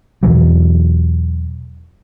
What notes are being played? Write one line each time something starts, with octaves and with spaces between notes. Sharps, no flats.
E2 B2 E3 F#3